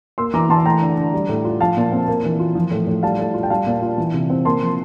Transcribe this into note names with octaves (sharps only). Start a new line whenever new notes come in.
A#3 C6 E6
E3 A#5 D6
E3 A5 C6
A3 G5 A#5
D3
D3
G3
A2
F4
F3 F5 A5
A#2
C4
A#3
E3
F4
F3
A2
A2
G3 F5 A5
A2
F4
G5
G3 F5 A5
A#2
F4
E3
C3
C4
A#3 A5 C6
F3